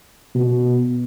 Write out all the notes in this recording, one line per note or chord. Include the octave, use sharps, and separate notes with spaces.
B2